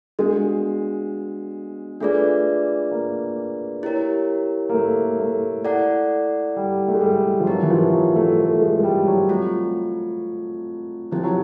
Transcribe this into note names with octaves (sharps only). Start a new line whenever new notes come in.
G#3 B3 D4 F#4
A3 D4 F4 G#4 B4 D5
A#3
E4 G4 A#4 C#5
A#3
A3
A3
E4 A4 D5 F#5
G3
A3
G#3
G3
F3
F#3 C4 D#4 G4 A#4
E3
F3
F#3
A3
A3
G#3
G#3
G3
F#3
A3 C4 F4
F3 A3 C4 E4 G4
F#3